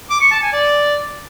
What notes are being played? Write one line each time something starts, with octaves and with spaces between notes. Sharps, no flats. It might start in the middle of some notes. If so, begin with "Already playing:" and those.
D6
C#6
A5
G#5
D5